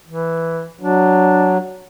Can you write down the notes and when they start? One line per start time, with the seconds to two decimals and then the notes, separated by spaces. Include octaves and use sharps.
0.08 E3
0.81 F#3 D4